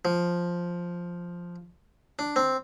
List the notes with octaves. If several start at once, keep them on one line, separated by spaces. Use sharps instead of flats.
F3
D4
C4